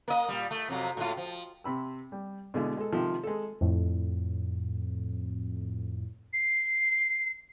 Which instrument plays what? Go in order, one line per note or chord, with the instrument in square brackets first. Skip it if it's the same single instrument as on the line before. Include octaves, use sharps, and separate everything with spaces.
[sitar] A#3 D#5
A#2 G3
A3
F2 C3 F#3
A2 G#3 F4
F3
[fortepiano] C3 B5 E6
G3
B2 D3 G#3 E4
G#3 A4
C3 D#3 F3
G#3 A4
[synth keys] F2 A2
[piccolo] C7